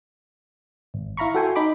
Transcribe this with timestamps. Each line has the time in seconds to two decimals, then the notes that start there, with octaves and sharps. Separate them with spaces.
0.94 G#1
1.17 E4 F5 A#5 B5 C#6
1.35 F#4 A4 G5 G#5 C6
1.56 D#4 B5 D6